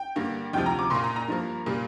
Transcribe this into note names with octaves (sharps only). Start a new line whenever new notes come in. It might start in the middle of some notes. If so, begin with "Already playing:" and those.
Already playing: G5
G2 D3 A#3
D2 C3 F3 G5
A#5
D6
A#2 A#3 C6
A#5
A#5
G2 F3 A#3
A#2 G3 A#3